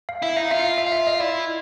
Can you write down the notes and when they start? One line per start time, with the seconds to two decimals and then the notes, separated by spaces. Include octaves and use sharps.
0.09 F5
0.22 E4 E5
0.36 D#4 F5
0.51 F4 E5
0.64 F5
0.78 E5
0.87 F5
0.92 E5
1.07 D#5
1.20 E4 D5